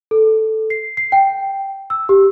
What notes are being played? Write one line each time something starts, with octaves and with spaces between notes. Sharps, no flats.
A4
C7
C7
G5
E6
G4